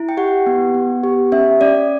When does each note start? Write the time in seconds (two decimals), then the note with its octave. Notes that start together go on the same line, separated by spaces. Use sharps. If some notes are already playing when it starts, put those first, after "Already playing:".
Already playing: E4
0.09 G5
0.17 G4 F#5
0.46 B3
0.75 B3
1.04 G4
1.32 C#4 E5
1.61 C#4 D5